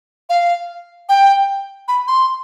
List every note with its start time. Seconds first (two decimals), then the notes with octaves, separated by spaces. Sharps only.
0.29 F5
1.09 G5
1.88 B5
2.08 C6